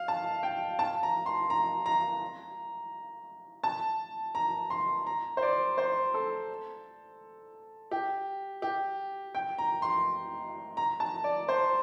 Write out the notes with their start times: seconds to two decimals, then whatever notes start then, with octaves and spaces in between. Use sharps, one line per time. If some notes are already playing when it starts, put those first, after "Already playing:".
Already playing: F5
0.08 A5
0.43 G5
0.79 A5
1.03 A#5
1.26 C6
1.50 A#5
1.86 A#5
3.64 A5
4.35 A#5
4.70 C6
5.06 A#5
5.37 C5
5.43 D5
5.78 C5
6.14 A4
7.91 G4
8.62 G4
9.35 G5
9.58 A#5
9.82 C6
10.77 A#5
11.00 A5
11.24 D5
11.48 C5